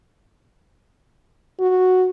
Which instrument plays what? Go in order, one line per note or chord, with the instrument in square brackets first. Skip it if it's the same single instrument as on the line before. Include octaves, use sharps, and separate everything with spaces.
[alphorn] F#4